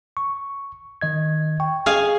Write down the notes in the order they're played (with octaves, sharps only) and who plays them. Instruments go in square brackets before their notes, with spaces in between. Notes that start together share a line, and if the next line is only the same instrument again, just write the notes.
[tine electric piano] C#6
D#3 D#5 G#6
G5 C#6
[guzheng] G#4 F5 G#5